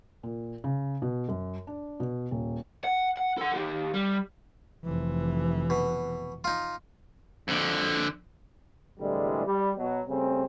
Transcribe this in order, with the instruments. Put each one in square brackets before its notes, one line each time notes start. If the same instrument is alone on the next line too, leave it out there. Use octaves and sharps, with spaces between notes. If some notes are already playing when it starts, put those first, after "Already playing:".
[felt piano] A#2
C#3
B2
F#2
D4
B2
D#1
[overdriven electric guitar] F#5
F#5
A4 F#5
D#3 G4
G3
[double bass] F1 E3
[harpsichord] B2
D#4 F4
[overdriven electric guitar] F2 D3
[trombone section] C2 A2 D3 E3 G3 G#3
G3
B2 F#3
C#3 G3 A3 C4